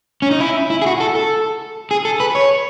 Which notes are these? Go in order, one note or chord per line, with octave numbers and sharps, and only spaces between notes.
C#4
D#4
E4
E4
G#4
F#4
A4
A4
G#4
A4
B4
C#5